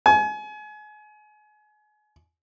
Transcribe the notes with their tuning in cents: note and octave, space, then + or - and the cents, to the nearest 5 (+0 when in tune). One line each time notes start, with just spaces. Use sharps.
G#5 +30